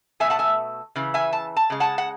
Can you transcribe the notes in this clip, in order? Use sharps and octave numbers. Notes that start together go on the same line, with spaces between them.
B2 A3 E5 G#5
F#5 A5
E5 G#5
C#3 E3
E5 G#5
A5
A5
C#3 G#3
F#5 A5
F#5